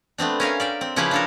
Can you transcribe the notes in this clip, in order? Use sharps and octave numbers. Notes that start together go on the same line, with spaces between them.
A3 B3 C4 D4
C#4 A#4 F5 G#5
D5 E5 G5
C4
C#3 F3 C#4 E4 G4 B4
D4 A4 A#4